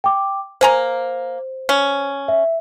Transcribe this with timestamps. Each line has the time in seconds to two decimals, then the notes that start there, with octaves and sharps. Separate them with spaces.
0.04 G5 D6
0.61 A#3 C5 G#5 A#5
1.69 C#4
2.28 E5